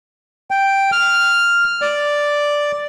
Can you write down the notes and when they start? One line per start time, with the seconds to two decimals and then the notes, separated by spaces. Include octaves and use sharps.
0.51 G5
0.92 F6
1.82 D5